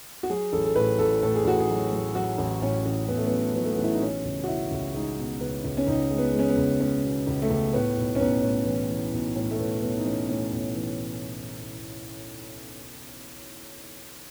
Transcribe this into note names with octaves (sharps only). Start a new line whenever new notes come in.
F#4
F#3 G#4
A1 A4
A4
A2 B4
A1 A4
A2 A4
G#4
A1 F#4
G#4
F#3
F#3
F#3 F#4
A1
A2 C#4
A1
A1 B3
A3
F#3 B3
F#3 B3
A3
B3
A1
E4
D#4
B2 C#4
C#2
F#4
B2 E4
C#2
G#3 D#4
B2
C#2 B3
C#2
C#4
C#2 D#4
G#3
B3
G#3
C#4
B3
C#2
G#3 C#4
B2
C#2
A3
C#2
A2 B3
B1
C#4
B1 B3
A2
E3
E3
B1
A2
A3
B1 B3
B1 B3
D#4
E3 C#4
A2 C#4
B1
E3